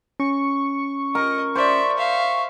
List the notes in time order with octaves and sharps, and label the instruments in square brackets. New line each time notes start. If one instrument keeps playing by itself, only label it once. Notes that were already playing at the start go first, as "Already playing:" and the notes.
[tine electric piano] C#4 [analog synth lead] C#6
[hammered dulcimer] A#4 [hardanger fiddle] D#5
[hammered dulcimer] C5 [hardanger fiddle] D5 E5
[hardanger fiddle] E5 F5